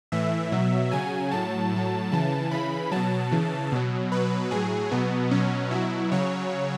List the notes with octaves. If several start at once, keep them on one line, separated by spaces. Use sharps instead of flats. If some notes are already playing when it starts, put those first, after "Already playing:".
A2 E3 E5
B2 F#3
C#3 F#3 G#5
A2 F#3 A5
A2 F#3
C#3 E3 A5
C#3 E3 B5
B2 F#3 A5
C#3 E3
B2 F#3
B2 F#3 B4
A2 F#3 G#4
B2 F#3 B3
B2 F#3 C#4
B2 F#3 E4
C#3 F#3 C#5